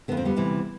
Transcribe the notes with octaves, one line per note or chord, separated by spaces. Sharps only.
F2 D3 B3
C4
G3 B3
D2 C3 E3